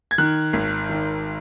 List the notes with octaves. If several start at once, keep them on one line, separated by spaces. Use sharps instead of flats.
G#6
D#3 F#6
G#1
D#3